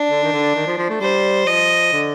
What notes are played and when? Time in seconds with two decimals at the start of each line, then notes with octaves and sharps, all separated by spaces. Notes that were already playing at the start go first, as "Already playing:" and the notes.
Already playing: D4
0.10 D3
0.24 D#3
0.33 D3
0.56 D#3
0.67 F3
0.78 F3
0.90 A3
1.01 G3 C5
1.46 F3 D#5
1.93 D3